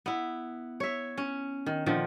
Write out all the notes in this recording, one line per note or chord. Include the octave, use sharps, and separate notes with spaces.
B3 E4
C#5 E5
C#4
D#3
A#2 D3 D#3 F3